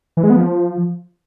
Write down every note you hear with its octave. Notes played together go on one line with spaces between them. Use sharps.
E3
G#3
B3
F3